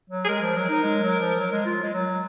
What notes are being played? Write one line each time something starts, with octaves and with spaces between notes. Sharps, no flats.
F#3
G#4
G#3 A#4
F3
F#3
D#4
G#3
F#3
F3
F#3
G#3
F4
G#3
F#3